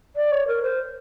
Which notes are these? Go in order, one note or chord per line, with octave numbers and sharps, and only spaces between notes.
D5
C#5
A#4
C5